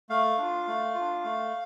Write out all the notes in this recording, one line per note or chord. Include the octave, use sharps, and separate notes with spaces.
A3 F5
D4 F4
A3
F4
D4
A3